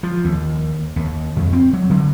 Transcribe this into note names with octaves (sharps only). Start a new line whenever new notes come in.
F3
D#2
D#2
F2
C4
F#3
D3